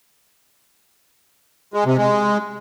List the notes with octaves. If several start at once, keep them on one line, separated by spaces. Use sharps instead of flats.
G#3
C3
G#3